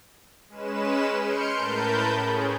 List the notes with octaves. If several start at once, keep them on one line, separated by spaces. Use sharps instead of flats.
G#3 C#4 B4 E7
C6 F6 G6 C#7 D7
A2 A#4 B4 A5 B5 G6
C#4 G#4